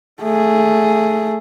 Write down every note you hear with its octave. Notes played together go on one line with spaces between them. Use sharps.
A3 G#4